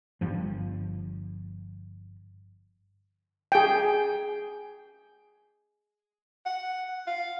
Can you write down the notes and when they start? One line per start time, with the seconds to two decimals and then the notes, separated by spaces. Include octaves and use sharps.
0.21 G1 G2 F3
3.52 G#4 G5
6.46 F#5
7.07 F5